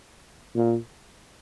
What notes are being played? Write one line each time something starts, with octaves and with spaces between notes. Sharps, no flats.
A#2